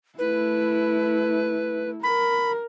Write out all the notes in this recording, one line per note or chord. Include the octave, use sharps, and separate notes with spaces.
A3 E4 B4
A#4 B5